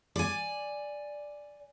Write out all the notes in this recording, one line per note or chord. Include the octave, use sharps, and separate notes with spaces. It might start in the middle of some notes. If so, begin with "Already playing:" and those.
D5 G#5